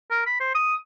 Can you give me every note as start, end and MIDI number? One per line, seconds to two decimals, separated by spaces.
0.11 0.22 70
0.26 0.38 83
0.40 0.50 72
0.55 0.76 87